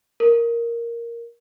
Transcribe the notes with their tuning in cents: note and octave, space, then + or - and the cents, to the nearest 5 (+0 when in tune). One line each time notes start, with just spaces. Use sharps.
A#4 +0